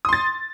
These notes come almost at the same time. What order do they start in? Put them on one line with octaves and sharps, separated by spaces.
D#6 C6 A6